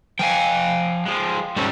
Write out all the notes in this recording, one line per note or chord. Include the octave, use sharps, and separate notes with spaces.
F3 F5 G5 G#5
F3 G#3
G#2 G3 C#4 F#4 A4